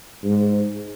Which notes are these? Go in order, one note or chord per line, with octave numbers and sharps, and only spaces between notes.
G#2